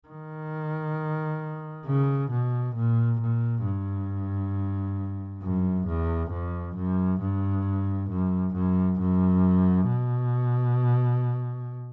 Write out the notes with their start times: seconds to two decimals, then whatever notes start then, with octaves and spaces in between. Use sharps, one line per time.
0.08 D#3
1.86 C#3
2.30 B2
2.75 A#2
3.20 A#2
3.64 G2
5.43 F#2
5.87 E2
6.31 F2
6.76 F#2
7.21 G2
8.10 F#2
8.54 F#2
9.00 F#2
9.88 B2